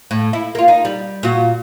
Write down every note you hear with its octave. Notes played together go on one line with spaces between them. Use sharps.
A2
E4
A#3 F4
D#4
G3
A#2 F#4